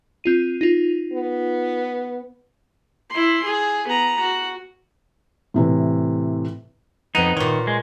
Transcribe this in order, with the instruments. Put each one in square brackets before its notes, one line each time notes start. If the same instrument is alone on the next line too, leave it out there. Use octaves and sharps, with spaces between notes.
[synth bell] C4 F4 D#7
D#4 F4
[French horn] B3
[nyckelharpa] E4 C6
G#4
B3 A#5
F#4
[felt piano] A2 C3 E3
[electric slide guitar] F2 D#4 [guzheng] B3
[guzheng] A#2 C#5 [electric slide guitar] D#3
[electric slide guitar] G#3